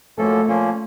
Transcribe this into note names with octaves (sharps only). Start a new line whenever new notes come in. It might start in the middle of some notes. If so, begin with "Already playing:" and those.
F#2 F3 A3 A#3 C#4 A4
A#2 F3 A#3 C#4